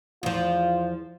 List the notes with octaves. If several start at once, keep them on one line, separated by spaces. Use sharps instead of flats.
E2 F3 F4